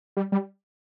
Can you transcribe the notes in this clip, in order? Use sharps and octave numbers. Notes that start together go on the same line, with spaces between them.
G3
G3